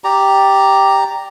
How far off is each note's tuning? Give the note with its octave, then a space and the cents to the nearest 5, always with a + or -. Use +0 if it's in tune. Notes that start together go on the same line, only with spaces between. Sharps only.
G4 +0 D5 +0 A#5 +0